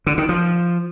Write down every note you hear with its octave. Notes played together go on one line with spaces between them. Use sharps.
D3
D#3
F3